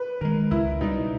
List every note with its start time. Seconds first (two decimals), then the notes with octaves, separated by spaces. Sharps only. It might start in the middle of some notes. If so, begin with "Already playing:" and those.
Already playing: B4
0.21 D#3 G#3 A#4
0.51 C#2 E4
0.81 B2 G3 D#4